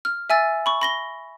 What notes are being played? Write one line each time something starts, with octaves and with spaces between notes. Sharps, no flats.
F6
E5 G#5 E6 A6
B5 C#6
B5 A#6 G7